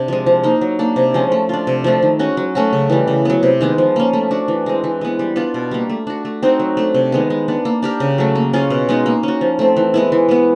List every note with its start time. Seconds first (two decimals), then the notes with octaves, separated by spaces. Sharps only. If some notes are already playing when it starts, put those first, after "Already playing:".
Already playing: C3 D4
0.08 F3 G#3
0.26 F3
0.43 A#3 D#4
0.61 F#3
0.79 A#3 D4
0.96 C3
1.14 F3 G#3 C#4
1.32 A3
1.49 D4 F4
1.67 C3
1.84 F3 A3 D4
2.02 D#3
2.19 G#3 C#4 F#4
2.37 F#3
2.55 A3 C#4 F#4
2.73 C#3
2.90 E3 G3
3.08 C#3
3.25 F#3 B3
3.43 C3
3.61 D#3 G#3 B3
3.78 F3
3.96 A#3 C#4
4.13 A3
4.31 D4 F#4
4.48 E3
4.66 G#3 C4
4.84 E3
5.01 G#3 B3
5.19 G3
5.36 B3 D4 F4
5.54 B2
5.71 G3 A#3
5.89 A3
6.07 D4 F#4
6.25 A3
6.43 C4 D#4 F#4
6.60 F#3
6.77 A3 D4
6.94 C3
7.12 D#3 G#3 B3
7.30 G#3
7.48 B3 D4
7.65 A#3
7.82 D4 G4 A#4
8.00 C#3
8.18 F#3 A3
8.35 A#3
8.53 C#4 F4 G#4
8.70 B2
8.89 G#3 B3 D#4
9.06 A#3
9.23 C#4 F#4
9.41 F3
9.59 A3 C4
9.77 E3
9.94 G#3 B3 E4
10.12 E3
10.29 G#3 B3